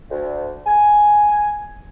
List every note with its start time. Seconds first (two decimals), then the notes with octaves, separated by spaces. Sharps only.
0.10 D2
0.66 G#5